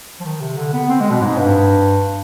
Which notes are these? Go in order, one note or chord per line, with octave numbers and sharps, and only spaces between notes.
F3
D#3
C3
D3
B3
C4
G#3
B2
G#2
G2